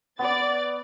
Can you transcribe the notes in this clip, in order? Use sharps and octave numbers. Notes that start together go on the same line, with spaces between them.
B3 D5 D6 A6